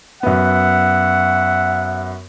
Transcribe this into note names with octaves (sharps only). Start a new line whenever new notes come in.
F#2 B3 E5 F#5